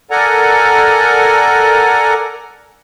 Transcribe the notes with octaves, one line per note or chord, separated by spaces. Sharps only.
A4 A#4 D5 F#5 G#5 A#5